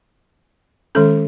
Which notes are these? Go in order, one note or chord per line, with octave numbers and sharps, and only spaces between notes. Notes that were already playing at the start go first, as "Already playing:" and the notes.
D#3 G#3 C#4 A4